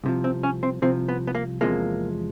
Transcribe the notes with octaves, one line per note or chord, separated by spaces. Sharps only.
C2 C3 F3
C4
C#4
C4
C2 C3 F3 C4
B3
B3
A#3
E2 C3 F3 G#3 A#3